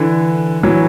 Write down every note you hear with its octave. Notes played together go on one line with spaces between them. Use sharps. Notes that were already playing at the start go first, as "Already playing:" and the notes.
Already playing: D3 E3
E3 F#3